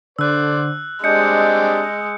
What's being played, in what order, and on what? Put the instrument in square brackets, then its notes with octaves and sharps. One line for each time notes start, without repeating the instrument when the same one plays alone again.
[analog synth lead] D3 [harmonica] C5 D5 [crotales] E6 F#6
[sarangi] G#3 [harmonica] C4 D4 G4 [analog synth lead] D#5 [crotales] G6 C#7